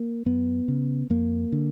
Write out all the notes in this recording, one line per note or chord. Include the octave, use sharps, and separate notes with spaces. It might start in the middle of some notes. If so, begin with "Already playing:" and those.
Already playing: A#3
F#2 B3
C#3
F2 A#3
D3